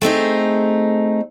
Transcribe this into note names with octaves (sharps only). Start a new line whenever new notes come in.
A3 C4 D#4 G#4